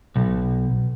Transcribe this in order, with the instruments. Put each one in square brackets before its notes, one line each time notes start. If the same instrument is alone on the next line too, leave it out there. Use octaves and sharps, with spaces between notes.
[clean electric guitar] B1